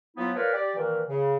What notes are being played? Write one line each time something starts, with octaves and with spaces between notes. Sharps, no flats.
F3 F#3 B3 E4 F4
F4 A#4 B4 C#5 D5
G4 D5
A#2 D#3 E3
C#3